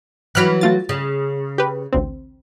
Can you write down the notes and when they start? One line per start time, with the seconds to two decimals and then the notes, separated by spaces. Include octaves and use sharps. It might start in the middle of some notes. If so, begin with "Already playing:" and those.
0.35 E3 F#3 B5 F6 F#6
0.61 A3 F4 A6
0.89 C#3
1.58 G4 B4
1.93 A1 D2 C4